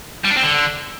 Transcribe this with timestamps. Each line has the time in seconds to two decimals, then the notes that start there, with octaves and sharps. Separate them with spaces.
0.25 G3
0.31 D4
0.37 C4
0.43 D3